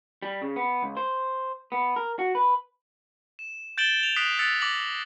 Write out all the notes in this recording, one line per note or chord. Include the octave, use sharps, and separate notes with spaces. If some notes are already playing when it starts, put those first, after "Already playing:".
G3
C#3
B3
C#2
C5
B3
A#4
F#4
B4
E7
G6 A6 D7 E7 F#7 G7
F7
D#6 F#6 B6 C7 D7 F#7
E6 F#6 A6 B6 C#7
D6 A#6 F#7